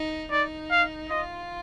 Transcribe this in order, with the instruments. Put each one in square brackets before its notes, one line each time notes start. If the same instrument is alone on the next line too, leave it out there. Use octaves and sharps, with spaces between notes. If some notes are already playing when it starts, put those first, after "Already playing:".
Already playing: [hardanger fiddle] D#4
[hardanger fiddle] D#4 [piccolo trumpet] D5
[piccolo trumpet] F5
[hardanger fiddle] F4 [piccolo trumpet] D#5